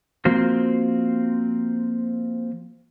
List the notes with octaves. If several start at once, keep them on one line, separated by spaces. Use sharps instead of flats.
F3 A#3 C4 F4 F#4